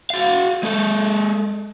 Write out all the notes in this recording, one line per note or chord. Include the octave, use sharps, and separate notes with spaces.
F#4 F5
G#3 A4